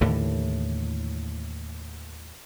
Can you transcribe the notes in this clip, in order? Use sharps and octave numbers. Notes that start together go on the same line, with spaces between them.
D#2 A2 D3 E3